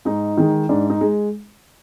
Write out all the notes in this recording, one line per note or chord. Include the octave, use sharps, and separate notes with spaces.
G#2 D#4
D#3 G#3
G#2 D4
D#4
G#3